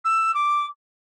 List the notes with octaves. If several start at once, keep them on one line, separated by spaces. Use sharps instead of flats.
E6
D6